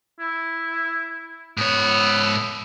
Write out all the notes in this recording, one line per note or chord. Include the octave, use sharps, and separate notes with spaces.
E4
G#2 B3 C#5